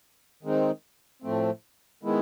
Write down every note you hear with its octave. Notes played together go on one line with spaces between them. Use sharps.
D#3 G#3 C4 D#4
A2 F3 A3 C4
D#3 G#3 B3 E4